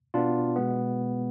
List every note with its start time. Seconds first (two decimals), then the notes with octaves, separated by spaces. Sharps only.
0.14 B2 B3 D4 F4
0.56 B2 G#3 B3